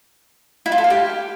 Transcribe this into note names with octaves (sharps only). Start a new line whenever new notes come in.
E4
F4
A4
F5
G4